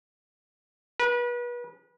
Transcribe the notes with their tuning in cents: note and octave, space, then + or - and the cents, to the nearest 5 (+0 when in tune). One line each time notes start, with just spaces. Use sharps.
B4 -35